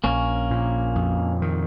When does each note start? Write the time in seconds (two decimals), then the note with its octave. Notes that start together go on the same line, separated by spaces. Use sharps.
0.04 A#1 A#3 C#4
0.51 A#2
0.95 F2
1.42 D#3